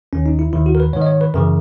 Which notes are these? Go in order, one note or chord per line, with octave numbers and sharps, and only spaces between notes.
D#2 D#3 C#4
D#4
E4
D#2 D#3 E4
F#4
A#4
B4
G#2 D#3 C#5
D#5
C#5
B4
F#2 C#3 E3 A#4